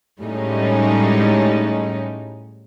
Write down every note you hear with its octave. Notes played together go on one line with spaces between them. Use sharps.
A2 G3 G#3 C#4 D#4